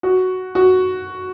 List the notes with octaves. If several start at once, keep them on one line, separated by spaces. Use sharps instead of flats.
F#4
F#4